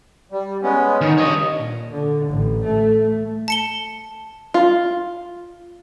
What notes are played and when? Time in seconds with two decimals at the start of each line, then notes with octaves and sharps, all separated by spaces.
0.32 G3
0.63 G#3 B3 C#4
1.01 D#3
1.18 G2 C#5 D#5
1.57 A#2
1.91 D3
2.28 A1
2.65 A3
3.48 A5 C#7 G7
4.54 F4